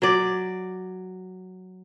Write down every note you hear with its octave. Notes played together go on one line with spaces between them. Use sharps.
F#3 D5